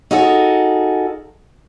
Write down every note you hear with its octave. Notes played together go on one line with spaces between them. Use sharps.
D#4 F4 F#4 G#4 A4